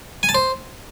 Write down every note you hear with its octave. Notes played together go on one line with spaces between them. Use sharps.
G#5
A5
C5